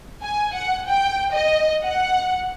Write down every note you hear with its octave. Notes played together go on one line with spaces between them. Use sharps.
G#5
F#5
G5
D#5
F#5